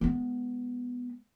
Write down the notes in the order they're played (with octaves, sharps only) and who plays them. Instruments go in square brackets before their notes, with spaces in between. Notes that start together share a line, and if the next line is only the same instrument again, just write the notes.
[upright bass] G#3 B3